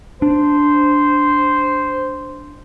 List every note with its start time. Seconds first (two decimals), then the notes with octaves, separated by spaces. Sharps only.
0.22 D4 C5